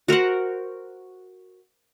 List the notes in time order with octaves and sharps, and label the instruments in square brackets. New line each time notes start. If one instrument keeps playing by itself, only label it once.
[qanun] F#4 A#4 C5 F#5